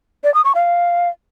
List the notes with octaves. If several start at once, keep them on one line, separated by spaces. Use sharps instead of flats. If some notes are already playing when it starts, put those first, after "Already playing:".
D5
D#6
C#6
F5